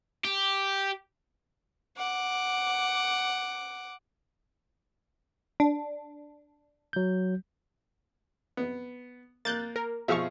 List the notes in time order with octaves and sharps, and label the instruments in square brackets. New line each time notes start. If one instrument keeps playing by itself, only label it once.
[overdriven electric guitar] G4
[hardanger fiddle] F#5 D6
[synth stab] D4
[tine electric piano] F#3 G6
[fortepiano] B3
[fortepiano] A#3 [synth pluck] F#6 G6 A6
[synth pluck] A#4
[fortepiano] B2 F3 G#4 [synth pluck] E5 F5 C#6